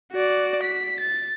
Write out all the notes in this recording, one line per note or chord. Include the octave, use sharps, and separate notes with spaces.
F#4 D5
B6
A6